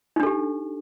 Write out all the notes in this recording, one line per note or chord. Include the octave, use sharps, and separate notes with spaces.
D4 D#4 G4 A4